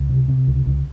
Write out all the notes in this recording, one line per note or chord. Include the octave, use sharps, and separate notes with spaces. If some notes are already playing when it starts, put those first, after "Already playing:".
Already playing: C#2
C3
C3
C#2
C#2